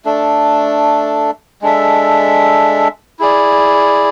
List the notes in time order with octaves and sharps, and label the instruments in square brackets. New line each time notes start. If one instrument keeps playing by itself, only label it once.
[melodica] A3 D4 A4
G#3 D4 A4 E5
E4 G#4 D5